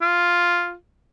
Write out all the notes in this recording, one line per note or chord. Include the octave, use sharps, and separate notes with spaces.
F4